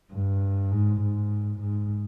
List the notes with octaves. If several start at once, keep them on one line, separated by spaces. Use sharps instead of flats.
G2
G#2
G#2
G#2